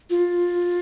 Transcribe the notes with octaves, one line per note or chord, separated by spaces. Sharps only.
F4